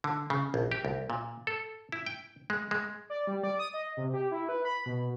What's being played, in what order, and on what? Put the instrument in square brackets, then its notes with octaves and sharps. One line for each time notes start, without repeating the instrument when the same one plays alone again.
[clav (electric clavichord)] D3
C#3
A#1
G4
C2
A#2
A4
E4
G5
G#3
G#3
[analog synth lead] D5
G3
D5
D#6
D#5
C3
G4
E4
B4
B5
B2